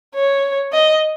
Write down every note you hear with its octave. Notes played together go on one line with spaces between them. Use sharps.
C#5
D#5